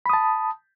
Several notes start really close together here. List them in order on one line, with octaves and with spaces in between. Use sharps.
B5 D#6 A5